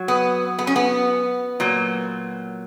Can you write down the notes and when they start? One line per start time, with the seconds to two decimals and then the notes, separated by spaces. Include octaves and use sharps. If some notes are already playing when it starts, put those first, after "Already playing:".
Already playing: F#3
0.08 B3
0.59 B3
0.67 C#4
0.76 B3
1.60 A#2 F#3